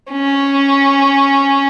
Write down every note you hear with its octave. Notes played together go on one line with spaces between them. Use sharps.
C#4